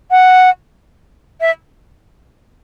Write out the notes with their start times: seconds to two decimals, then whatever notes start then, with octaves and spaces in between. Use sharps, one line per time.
0.11 F#5
1.41 E5